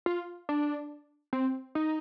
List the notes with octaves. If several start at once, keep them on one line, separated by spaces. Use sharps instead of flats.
F4
D4
C4
D#4